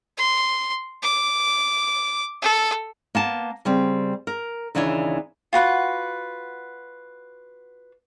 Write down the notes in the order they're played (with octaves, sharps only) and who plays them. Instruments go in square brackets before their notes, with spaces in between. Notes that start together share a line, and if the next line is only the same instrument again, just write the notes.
[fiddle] C6
D6
A4
[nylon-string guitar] A#3 B3 A5
C#3 G3 C4
A#4
D#2 C#3 E3 D4 C#5
[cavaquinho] F4 F#4 B4 F#5